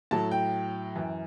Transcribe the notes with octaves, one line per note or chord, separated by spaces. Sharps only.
A2 F#3 A5
G5
F#2 E3